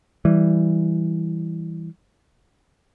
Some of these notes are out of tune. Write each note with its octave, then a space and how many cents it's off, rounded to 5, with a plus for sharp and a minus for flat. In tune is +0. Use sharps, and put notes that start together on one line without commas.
E3 +0 G3 +0